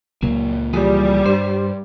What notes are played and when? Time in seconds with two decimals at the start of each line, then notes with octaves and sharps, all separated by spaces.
0.23 C#2 A#2 F#3 A#3
0.73 E3 F3 G3 G#4
1.26 G2 C5